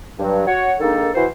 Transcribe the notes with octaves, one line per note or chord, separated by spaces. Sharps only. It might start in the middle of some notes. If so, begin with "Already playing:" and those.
G2 F#3
F#4 C#5
D#3 G#3 A#3 D4 D#4 A4
E3 F#4 C5